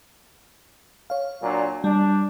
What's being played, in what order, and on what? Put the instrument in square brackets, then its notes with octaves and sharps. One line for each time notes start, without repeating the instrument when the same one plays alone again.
[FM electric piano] C#5 F5
[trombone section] A#2 F#3 D4
[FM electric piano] G3 [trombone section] D4